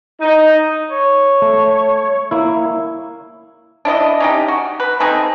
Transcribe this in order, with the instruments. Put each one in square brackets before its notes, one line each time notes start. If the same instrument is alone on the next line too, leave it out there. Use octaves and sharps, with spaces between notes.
[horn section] D#4
[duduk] C#5
[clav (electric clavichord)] A3
A#3 E4
[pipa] D4 E4 D5 D#5
C#4 D#4 G4
F#4
B4
C4 D#4 G#4 A4